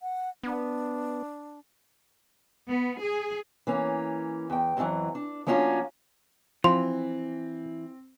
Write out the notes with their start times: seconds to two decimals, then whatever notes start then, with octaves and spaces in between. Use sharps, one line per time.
0.01 F#5
0.43 B3 D4
2.68 B3
3.02 G#4
3.67 E3 A#3 C#4
4.50 E2 G5
4.77 F2 B2 D3 E3 F#3
5.15 D4
5.47 F3 A#3 C#4 D4 F4 F#4
6.64 E3 F3 C4 C6